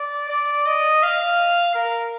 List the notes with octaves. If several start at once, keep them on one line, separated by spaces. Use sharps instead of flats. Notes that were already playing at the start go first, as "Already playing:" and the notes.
Already playing: D5
D5
D#5
F5
A#4